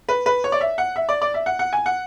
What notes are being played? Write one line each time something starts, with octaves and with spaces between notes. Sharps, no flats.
B4
B4
C#5
D5
E5
F#5
E5
D5
D5
E5
F#5
F#5
G#5
F#5